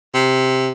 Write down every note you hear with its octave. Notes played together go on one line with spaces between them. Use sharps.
C3